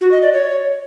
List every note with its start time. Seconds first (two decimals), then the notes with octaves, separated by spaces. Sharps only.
0.01 F#4
0.12 D#5
0.22 D5
0.33 C#5